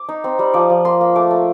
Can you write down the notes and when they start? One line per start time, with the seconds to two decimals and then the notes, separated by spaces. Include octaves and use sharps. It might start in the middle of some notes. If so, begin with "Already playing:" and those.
Already playing: D6
0.09 D#4
0.24 C4
0.39 G3
0.54 F3 D6
0.70 F3
0.85 A#3 C6
1.01 A#3
1.16 A3 D6
1.31 A3